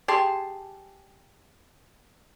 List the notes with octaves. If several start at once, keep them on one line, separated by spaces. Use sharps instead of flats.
G4 G#4 A5 C6